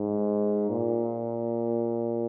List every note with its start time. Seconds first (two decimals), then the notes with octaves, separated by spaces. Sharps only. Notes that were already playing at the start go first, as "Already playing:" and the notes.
Already playing: G#2
0.70 A#2